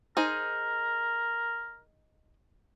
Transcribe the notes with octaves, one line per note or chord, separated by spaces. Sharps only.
D#4 G#4 A#4 C5